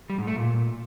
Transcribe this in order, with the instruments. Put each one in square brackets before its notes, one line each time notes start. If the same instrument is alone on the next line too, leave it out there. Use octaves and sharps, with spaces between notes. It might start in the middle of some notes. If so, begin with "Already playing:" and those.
[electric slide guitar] G3
G#2
A3
A#2